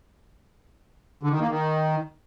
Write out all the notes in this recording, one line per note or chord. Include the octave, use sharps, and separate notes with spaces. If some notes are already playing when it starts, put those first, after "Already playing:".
D3
D#3
A#3
D#3